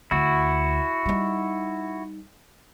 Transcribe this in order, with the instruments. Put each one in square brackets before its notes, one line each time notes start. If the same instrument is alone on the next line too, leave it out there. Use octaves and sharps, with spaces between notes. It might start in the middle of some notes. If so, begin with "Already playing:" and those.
[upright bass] D2 [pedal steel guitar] E4 F#4
[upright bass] G3 D#4